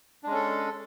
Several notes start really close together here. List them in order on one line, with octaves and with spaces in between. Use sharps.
D4 G#3 C#4 A4